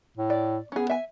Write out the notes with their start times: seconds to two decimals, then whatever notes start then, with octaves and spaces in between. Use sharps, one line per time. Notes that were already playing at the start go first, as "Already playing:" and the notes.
0.17 A2
0.30 D5
0.72 B3 C#4 G#4
0.90 E5 G#5